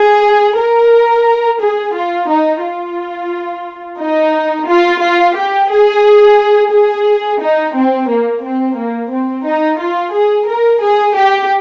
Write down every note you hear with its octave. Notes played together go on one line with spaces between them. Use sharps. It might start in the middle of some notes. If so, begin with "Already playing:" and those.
Already playing: G#4
A#4
G#4
F4
D#4
F4
D#4
F4
F4
G4
G#4
G#4
D#4
C4
A#3
C4
A#3
C4
D#4
F4
G#4
A#4
G#4
G4